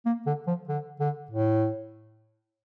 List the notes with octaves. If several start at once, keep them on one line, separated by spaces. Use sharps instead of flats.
A#3
D3
F3
D3
D3
A2